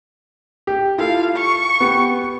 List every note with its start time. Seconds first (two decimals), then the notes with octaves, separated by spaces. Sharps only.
0.67 G4
0.98 E4 F4 A4 F5
1.36 C#6
1.80 B3 G4